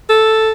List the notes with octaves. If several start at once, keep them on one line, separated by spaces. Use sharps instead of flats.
A4